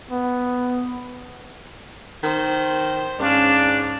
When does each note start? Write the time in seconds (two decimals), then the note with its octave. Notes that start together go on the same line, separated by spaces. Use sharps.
0.11 B3
2.23 D#3 C5
3.19 G#2 C#4 D4 F5